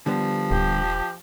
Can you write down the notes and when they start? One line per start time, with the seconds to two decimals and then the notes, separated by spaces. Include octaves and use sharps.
0.06 D3 F3 G3 B3
0.51 D#1 G4